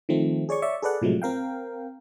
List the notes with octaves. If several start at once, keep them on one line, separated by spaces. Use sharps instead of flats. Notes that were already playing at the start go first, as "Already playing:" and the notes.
D#3 F3 A3 C4
G#4 C#5 D5 C#6
C#5 D5 E5 C#6
G#4 A4 B4 D5 F#5
A2 C3 F3 F#3 G#3 A3
C4 A#4 F5 G5